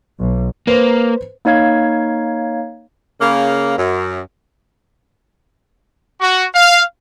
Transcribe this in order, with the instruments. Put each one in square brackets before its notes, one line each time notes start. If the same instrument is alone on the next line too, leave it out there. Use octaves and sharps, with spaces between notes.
[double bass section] B1
[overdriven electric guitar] A#3 [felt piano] B4 C5
[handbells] A#3 D#4 C#5 F5 G#6
[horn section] C#3 A#3
F#2
[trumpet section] F#4
F5